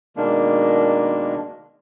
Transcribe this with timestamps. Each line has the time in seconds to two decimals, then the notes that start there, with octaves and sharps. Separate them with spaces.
0.17 B2 D#3 G#3 A#3 D4